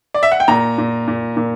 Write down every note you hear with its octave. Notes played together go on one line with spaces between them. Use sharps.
D5
E5
F#5
G5
A#2 A#5
A#2
A#2
A#2